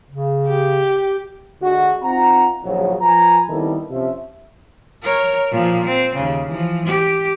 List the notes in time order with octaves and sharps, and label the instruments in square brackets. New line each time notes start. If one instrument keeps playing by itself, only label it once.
[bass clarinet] C#3
[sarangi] G4
[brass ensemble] D3 G#3 F#4
C4 D#4 F4 F#5 A#5
A#1 D#2 A#2 C#3 F3 F#3
F3 B4 G#5 A#5
D#3 G3 B3 C4 E4 A4
C3 F3 C#4 E5
[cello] A#4 C#5
A#2 F3
C4
D#2 C#3
E3 F3
G4